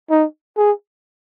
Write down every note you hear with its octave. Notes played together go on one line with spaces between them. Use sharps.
D#4
G#4